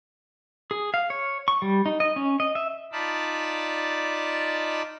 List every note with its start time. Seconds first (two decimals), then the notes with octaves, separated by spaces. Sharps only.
0.71 G#4
0.94 F5
1.10 C#5
1.48 C#6
1.62 G3
1.86 D#4
2.00 D#5
2.16 C#4
2.40 D#5
2.55 E5
2.92 D#4 F4 D5 A5 B5